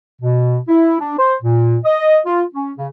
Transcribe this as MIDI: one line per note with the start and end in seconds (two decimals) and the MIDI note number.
0.22 0.58 47
0.68 0.97 64
1.00 1.14 62
1.18 1.34 72
1.42 1.78 46
1.84 2.19 75
2.26 2.42 65
2.54 2.71 61
2.78 2.87 49